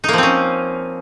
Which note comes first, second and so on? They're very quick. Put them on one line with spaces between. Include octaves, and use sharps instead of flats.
D#4 A#3 F3 C4 C#4